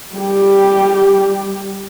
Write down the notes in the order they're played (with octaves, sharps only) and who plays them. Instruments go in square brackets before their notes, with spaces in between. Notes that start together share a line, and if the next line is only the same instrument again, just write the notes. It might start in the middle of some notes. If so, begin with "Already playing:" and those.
[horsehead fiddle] G3 G4